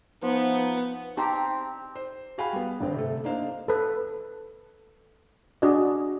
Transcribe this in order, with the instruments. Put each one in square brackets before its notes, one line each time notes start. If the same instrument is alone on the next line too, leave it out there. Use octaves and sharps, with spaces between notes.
[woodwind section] F3 D#4 [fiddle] B3
[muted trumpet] C4 [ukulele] D#4 [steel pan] G4 [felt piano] A5 A#5 C6
[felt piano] C5
F#4 G#4 F5 G5 G#5 B5
G3 B3
G#1 G2 D3 C4
C3 A3 A4
A#3 D4 D#4 A#4 C5 F5
[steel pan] A4 B4
D4 F#4 G#4 D5 D#5